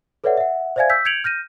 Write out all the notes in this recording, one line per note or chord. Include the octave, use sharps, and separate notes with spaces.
A4 B4 C#5 D5 E5 F#5
E5 F#5
C5 D5 E5 F5 G#5 G#6
E6 G6 B6
G6 G#6 C#7 D7 F7 F#7
F6 G6 A#6 D#7